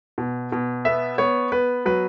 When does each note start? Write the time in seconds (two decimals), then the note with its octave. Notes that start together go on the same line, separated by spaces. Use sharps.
0.18 B2
0.52 B2
0.85 B3 E5
1.18 B3 C#5
1.52 B3 B4
1.85 F#3 B4